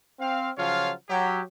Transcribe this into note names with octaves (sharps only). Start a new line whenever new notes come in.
C4 F5
C#3 F3 F#3 F4 C#5 F5
F#3 G4